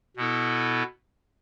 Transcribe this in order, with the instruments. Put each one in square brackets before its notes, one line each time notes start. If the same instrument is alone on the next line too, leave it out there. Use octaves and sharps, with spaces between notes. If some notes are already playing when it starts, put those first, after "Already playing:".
[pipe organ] B2 B3 E4 A4